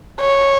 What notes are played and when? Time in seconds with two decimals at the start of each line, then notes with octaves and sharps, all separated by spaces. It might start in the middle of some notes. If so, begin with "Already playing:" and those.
0.20 C#5